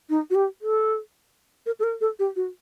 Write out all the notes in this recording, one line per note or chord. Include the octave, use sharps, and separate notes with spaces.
D#4
F#4
G4
A4
A#4
A4
A#4
A4
G4
F#4